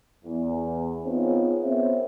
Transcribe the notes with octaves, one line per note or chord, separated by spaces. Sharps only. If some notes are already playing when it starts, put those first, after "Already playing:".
E2
B3 C4 D#4 F4 G#4 C#5
B3 C4 A#4 C5 C#5 E5